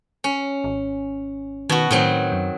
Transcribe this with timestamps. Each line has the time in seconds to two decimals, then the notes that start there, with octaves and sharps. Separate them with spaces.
0.24 C#4
0.64 G#1
1.69 B2 D#3 F#4
1.91 A2 D#3 F#3 C4
2.32 F#2